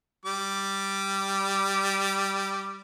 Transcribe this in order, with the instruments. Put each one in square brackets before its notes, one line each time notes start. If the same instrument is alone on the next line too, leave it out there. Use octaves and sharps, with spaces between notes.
[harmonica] G3 D6